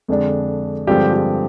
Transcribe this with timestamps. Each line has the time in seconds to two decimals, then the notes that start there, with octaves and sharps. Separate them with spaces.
0.08 F2 D3 G#3 D4
0.87 G2 D3 F3 G#3 C4 G4
1.14 G4